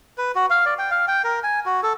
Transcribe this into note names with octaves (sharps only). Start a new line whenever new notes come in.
B4
F#4
F5
D5
G5
F5
G5
A#4
G#5
F#4
A4